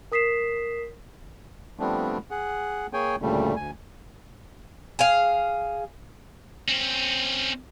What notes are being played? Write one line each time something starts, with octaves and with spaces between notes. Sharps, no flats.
A#4 D#6 B6 C7 E7
F3 G3 A3 B3 C4 D4
G#4 F#5
A#3 G#4 C#5 G5 G#5
D2 A#2 C#3 G3 A3
D2 G#5
G#4 F5
C4 C#4